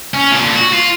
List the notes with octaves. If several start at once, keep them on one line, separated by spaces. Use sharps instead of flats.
C#4
A#2 D3
F#4
F4